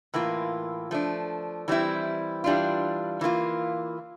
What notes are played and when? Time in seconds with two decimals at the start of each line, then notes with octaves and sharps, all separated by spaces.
0.14 A2 E3 A#3 F4
0.91 F3 A3 D4
1.68 E3 G3 C4 E4
2.44 E3 G3 D4 F4
3.21 E3 A#3 F4